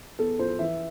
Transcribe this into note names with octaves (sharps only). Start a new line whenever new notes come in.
E2 A4
F3 C5
E3 E5